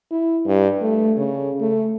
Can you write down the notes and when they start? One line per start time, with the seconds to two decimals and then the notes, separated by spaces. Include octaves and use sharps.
0.11 E4
0.46 G2
0.82 A3
1.18 C#3
1.60 A3